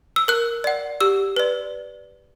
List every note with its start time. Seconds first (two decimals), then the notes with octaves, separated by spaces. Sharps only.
0.16 E6
0.28 A#4 F#6
0.64 D5 F#5
1.00 G4 E6
1.36 B4 D5